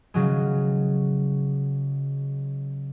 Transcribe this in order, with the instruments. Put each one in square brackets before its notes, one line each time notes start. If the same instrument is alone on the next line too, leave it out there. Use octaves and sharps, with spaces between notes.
[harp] C#3 F#3 G#3